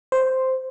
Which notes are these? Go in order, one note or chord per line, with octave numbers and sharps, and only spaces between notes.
C5